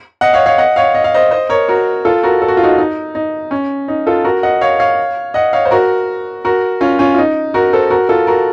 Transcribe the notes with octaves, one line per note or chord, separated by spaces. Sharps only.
D#5 F#5
C#5 F5
C#5 F5
D#5 F#5
C#5 F5
D#5
F5
C5 D#5
C5 D#5
A#4 C#5
F#4 A#4
F4 A4
F#4 A#4
A4
F#4
F4
D#4 F#4
D#4
D#4
C#4
D#4
F4 A4
F#4 A#4
D#5 F#5
C#5 F5
C#5 F5
D#5 F#5
C#5 F5
C5
F#4 A#4
F#4 A#4
C#4 F4
C#4 F4
F4
D#4
F#4 A#4
A4 C5
F#4 A#4
F4 A4
F#4 A#4